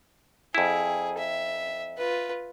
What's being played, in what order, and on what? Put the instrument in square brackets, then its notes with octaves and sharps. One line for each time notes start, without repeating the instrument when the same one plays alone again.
[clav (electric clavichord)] F2 E4 [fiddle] G#4
[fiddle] E5
F4 B4